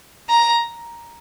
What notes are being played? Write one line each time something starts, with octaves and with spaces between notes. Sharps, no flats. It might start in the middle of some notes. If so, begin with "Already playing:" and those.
A#5